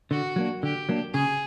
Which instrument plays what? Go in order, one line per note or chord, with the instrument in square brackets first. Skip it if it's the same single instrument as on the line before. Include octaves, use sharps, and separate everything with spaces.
[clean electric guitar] D3 [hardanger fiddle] F#4
[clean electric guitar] F#3 A#3 D4
[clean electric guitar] D3 [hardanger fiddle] G4
[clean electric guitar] F#3 A#3 D4
[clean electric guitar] C#3 [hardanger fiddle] G#4